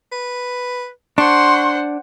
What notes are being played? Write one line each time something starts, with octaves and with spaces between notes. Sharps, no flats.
B4
D4 C5 F#5 C6 C#6